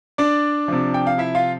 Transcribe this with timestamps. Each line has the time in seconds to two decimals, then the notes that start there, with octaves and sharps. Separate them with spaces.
0.18 D4 D5
0.68 C3 F3
0.94 G5
1.07 F5
1.18 E4 E5
1.35 F4 F5